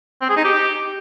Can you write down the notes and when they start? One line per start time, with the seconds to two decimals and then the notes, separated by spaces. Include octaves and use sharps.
0.22 C4
0.29 G#4
0.37 D#4
0.44 G4